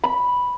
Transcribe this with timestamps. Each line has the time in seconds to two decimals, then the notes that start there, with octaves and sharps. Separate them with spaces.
0.04 B5